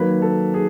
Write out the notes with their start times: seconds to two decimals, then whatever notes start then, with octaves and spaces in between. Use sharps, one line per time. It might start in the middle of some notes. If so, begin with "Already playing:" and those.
Already playing: D#3 F#3 A#3 B4
0.22 A4
0.54 G#4